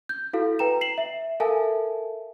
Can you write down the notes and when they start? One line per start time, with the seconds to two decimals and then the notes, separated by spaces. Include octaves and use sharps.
0.09 G6
0.33 E4 F#4 A4 F5
0.59 B4 G5 A#5 E7
0.81 C7 E7 F#7
0.98 E5
1.40 A4 A#4 E5 F5 G#5 A5